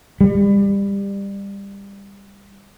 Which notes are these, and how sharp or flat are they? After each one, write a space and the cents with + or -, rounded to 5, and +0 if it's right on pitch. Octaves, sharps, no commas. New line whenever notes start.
G3 +25